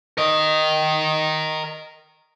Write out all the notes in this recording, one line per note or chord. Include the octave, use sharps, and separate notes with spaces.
A#4 D#5